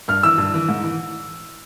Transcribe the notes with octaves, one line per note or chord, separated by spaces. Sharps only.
G2 F6
E3 E6
G2
E3
G#2
E3